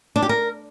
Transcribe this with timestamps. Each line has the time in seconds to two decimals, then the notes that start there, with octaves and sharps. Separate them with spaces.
0.16 D4
0.22 G4
0.29 A#4